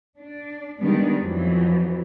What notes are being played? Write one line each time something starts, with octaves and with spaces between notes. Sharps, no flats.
D4
D#3 G3 G#3 B3 D4
F2 E3 F#3